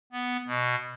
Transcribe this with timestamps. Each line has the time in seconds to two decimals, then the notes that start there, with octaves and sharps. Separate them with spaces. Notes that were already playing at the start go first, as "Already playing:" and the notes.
0.12 B3
0.48 B2